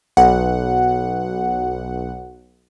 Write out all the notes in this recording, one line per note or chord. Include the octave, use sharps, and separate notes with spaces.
B1 F#5